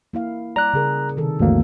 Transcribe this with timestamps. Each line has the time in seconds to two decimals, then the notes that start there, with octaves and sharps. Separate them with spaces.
0.13 A#3 E4 F5
0.56 G3 D5 A#5 F#6
0.74 C#3 G#4 A#4
1.17 C3 D#3 A4
1.39 G1 D2 E3 A#3 C4